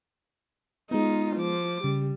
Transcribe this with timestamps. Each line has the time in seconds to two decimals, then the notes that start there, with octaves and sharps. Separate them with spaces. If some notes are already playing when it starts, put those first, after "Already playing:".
0.91 G#3 B3 D#4 F4
1.37 F3 D6
1.84 C#3 G3